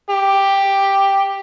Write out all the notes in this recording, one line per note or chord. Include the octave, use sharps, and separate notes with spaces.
G4